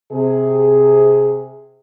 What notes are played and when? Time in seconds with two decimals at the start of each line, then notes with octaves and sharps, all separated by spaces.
0.12 C3 G#4